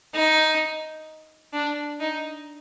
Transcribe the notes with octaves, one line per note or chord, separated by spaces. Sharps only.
D#4
D4
D#4